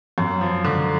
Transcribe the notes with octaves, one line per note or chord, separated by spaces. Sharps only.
F#2
F3
D3